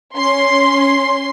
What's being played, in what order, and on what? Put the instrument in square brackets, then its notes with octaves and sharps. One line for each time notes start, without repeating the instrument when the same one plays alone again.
[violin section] C#4 C6